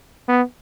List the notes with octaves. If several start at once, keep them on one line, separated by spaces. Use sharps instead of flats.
B3